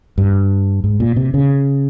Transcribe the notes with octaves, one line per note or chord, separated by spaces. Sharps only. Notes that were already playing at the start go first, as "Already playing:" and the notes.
G2
G#2
A#2
C3
C#3